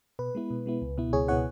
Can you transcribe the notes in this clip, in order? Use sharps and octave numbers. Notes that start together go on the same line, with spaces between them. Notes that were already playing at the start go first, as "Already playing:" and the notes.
B2 B4
G#3 B3 E4
B2
G#3 B3 E4
C#2
B2 B3 E4
C#2 G#4 C#5
B2 B3 E4 C#5 F#5